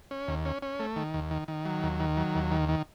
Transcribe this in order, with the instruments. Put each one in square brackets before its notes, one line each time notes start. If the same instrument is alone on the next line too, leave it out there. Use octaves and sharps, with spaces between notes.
[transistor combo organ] C#4
D#2
C#4
C#4
A3
D#3
D#2
D#3
D#3
F#3
D#2
D#3
F#3
D#2
D#3
D#3